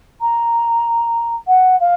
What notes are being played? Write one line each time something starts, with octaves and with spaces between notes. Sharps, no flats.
A#5
F#5
F5